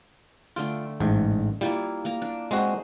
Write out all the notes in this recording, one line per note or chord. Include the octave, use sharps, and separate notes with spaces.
D3 A3 F4 G5
A1 G#2
G3 A#3 E4 F4
A#3 A#5
D4
G#3 C4 F#4 G#4 C5